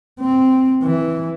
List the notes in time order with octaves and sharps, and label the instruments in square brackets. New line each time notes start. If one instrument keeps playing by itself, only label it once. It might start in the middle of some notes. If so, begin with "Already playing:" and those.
[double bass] C4
E3